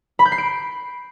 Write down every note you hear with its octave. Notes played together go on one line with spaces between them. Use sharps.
B5
G6
C7
D7